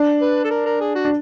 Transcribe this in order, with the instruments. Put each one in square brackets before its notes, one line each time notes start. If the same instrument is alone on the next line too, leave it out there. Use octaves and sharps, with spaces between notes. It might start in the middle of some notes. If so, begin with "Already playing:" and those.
Already playing: [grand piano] D4
[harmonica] B4
A4
A#4
A#4
G#4
F#4
[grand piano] D4